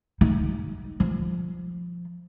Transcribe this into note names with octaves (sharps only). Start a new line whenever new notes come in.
D#4
F3